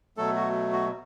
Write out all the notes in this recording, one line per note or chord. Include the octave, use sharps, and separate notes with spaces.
B2 F#3 A3 A4
F#4
F#4